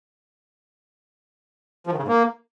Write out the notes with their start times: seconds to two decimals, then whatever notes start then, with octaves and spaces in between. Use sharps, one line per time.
1.87 F3
1.92 D#3
1.98 C#3
2.03 G#2
2.08 A#3